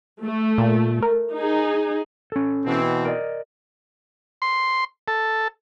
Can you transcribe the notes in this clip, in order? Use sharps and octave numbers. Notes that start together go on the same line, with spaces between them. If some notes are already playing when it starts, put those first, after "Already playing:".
A3
A#2
A#4
D#4 G#4
C#4 A4
B2 E3 C4
A#4 D5 D#5
C6
A4